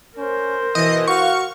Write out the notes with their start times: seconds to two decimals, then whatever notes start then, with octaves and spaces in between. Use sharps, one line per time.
0.17 C#4 A#4 C5
0.75 B2 E3 D#5
1.07 F#4 F5 C#6